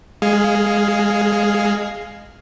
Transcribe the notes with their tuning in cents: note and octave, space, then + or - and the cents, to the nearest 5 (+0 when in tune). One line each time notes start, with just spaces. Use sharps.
G#3 -15 G#4 +10 F5 +0